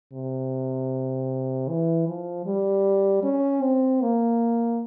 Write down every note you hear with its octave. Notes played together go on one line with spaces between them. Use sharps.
C3
E3
F3
G3
C#4
C4
A#3